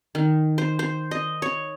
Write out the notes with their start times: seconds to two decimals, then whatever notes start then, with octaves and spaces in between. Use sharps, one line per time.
0.15 D#3
0.58 C5
0.79 C5
1.11 D#5
1.42 C#5